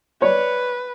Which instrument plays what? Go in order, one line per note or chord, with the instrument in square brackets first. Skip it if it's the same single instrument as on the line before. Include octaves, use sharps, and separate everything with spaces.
[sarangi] B4 [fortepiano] C#5 D5